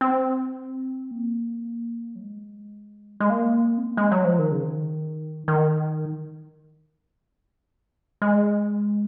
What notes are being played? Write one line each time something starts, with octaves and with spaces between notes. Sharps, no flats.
C4
A#3
F#3
G#3
G#3
A#3
C4
A#3
G#3
F#3
F3
D#3
C#3
D#3
D#3
G#3